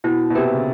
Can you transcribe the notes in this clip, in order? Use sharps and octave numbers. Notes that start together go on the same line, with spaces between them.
B2 E4
B2
C3 G4 B4
C#3